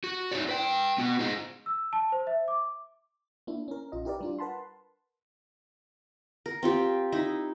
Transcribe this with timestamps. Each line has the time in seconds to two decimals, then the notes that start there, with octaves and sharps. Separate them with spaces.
0.04 F#4
0.32 D#4 E4 F#4 G4 C#5 D5
0.48 B4 G5
0.98 B3 F#4
1.19 D#4 F4 G#4 D#5
1.66 E6
1.93 A5
2.12 C5
2.27 E5
2.48 D6
3.47 A#3 D4 E4
3.68 C#4 A#4
3.92 A#1 F4 D#5
4.05 E4 G4 A#4 B4 D5
4.21 G3 D4 F4
4.39 A#4 B4 F#5 A5 B5 C6
6.46 A#4
6.63 C4 F4 G4
7.12 D#4 E4